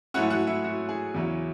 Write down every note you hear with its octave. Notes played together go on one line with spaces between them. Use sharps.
G#2 F#3 A3 C#4 E4 F#4 F#5
F#4 F#5
E4 E5
F#4
G#4
E2 C#3 F#3 C#4 E4